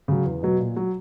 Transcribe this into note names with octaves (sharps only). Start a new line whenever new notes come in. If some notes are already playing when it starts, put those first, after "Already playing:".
C#3 F#3
E2
B2 F#3
A#2
F#3